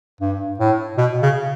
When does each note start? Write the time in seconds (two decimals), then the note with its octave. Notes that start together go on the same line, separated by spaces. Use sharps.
0.21 G2
0.60 A2
0.98 B2
1.22 C#3